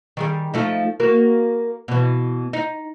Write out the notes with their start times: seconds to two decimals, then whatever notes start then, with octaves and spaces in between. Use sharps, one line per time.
0.17 D#3 G3 G#4
0.54 F3 A3 D#4
1.00 A#3 F#4 A#4
1.88 B2 E3
2.53 D#4